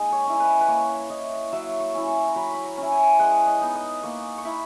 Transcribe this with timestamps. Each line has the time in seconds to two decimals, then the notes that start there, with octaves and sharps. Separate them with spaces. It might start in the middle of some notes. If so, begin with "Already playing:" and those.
Already playing: G#3 A#3 D#4 D#5
0.12 C#5
0.26 C#4 E4
0.40 B4
0.61 B4
0.68 A#3 C#5
1.10 E4 D#5
1.52 F#3 E5
1.80 C#6
1.95 C#4 E4
2.08 C#6
2.28 A#5
2.36 F#3 B5
2.53 B5
2.64 A#5
2.78 C#4 E4
2.92 G#5
3.19 G#3 F#5
3.47 D#5
3.61 B3 D#4
3.76 D#5
4.03 A#3 C#6
4.38 C#6
4.45 E4 B5